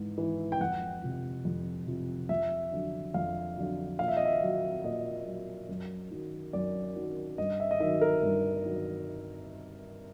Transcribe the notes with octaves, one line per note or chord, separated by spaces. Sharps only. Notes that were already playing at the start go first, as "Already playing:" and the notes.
Already playing: G#2 E3
E3
G5
F2 F#5
C3 F3
F2
C3 F3
F2 E5
D3 F#3
F2 F5
D3 F#3
A#2 F5
E5
D#5
E5
F#3
A#2 D#5
F#3
F#2
D#3 F#3
F#2 D5
D#3 F#3
G2 D#5
E5
D#5
D#3 F#3 E5
A#4
G2
D#3 F#3